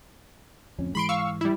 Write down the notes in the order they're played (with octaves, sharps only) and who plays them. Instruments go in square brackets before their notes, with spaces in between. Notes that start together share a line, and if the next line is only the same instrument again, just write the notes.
[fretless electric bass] D1 F2 C#4
[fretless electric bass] G#2 E3 G#3 [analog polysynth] B5 C6 D7
[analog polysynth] F5 C#6 E6
G3 E4